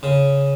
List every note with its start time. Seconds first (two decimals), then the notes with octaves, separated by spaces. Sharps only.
0.03 C#3